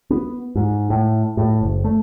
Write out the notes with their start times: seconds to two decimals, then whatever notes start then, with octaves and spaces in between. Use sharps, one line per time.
0.10 B3
0.55 G#2
0.90 A2
1.37 A2
1.61 F#1
1.84 A3